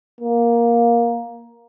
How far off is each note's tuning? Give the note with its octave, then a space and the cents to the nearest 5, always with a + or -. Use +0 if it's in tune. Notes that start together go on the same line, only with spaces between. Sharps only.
A#3 +10